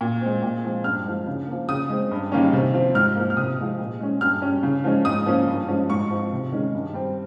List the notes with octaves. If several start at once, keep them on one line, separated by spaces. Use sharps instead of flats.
A#2
G#3 C4
A#2
F3 G#3 C4
G2 F6
F3 G#3
C#3
F3 A#3
C#3 D#6
G#3 C4
G2
D#3 G3 A#3 C#4
C3
F3 C4
G#2 F6
F3 A#3
F6
C3 D#6
F3 G#3 C4
A#2
G#3 C#4
G2 F6
G3 C#4
C#3
F3 G#3 C#4
G#2 D#6
F3 A#3 C#4
G2
F3 G#3 C#4
G#2 C#6
F3 C4
C3
D#3 G#3 C#4
G2
G3 C4